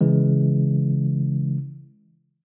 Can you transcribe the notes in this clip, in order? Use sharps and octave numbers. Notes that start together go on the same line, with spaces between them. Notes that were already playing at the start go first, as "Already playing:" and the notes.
C#3 E3 G#3